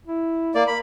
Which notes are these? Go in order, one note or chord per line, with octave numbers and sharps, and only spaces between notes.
E4
A#3 D5
A#4 B5